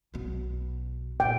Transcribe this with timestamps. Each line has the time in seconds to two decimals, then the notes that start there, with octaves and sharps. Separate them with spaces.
0.14 B1 B2
1.20 D#2 A#2 G5